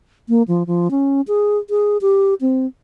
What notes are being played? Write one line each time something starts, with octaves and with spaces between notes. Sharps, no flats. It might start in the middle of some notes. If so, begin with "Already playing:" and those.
A#3
F3
F3
C#4
G#4
G#4
G4
C4